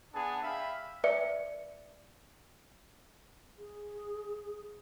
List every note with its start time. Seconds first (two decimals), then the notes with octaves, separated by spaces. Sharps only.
0.14 B3 D4 G#4 A5
0.43 E5 F5 G5 B5
1.04 B4 D5 E5 C#7
3.58 G#4